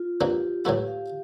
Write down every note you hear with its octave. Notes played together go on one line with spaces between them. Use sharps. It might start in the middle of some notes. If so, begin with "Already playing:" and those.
Already playing: F4
F2 E3 A#3 D4 G4
A2 E3 A3 E4 G4
F5